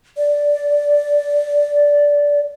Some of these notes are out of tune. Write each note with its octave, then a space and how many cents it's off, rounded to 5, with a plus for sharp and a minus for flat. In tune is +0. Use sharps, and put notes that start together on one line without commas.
D5 -10